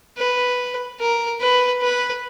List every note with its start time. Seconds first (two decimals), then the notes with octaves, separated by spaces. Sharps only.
0.18 B4
1.00 A#4
1.41 B4
1.82 B4